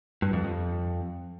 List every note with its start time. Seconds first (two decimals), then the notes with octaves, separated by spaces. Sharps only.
0.22 G2
0.33 F2
0.44 F2